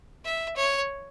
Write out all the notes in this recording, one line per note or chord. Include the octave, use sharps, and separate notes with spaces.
E5
C#5